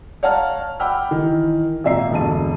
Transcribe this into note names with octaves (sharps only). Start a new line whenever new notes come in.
C#5 F5 F#5 A5 A#5 F6
F#5 G5 B5 D6 E6 F6
D#3 E3
G#1 A#2 E5 A#5 C7
E1 D2 G2 A5 D#7